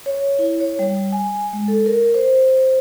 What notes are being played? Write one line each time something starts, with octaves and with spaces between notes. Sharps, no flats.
C#5
E4
C#5
G3
G#5
G#3
A4
A#4
C5